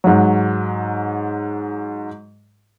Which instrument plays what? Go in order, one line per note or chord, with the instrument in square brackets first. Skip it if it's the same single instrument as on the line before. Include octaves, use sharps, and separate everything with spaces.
[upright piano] G#2 F#3